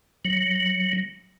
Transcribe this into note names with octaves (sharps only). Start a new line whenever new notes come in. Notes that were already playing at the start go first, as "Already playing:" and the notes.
F#3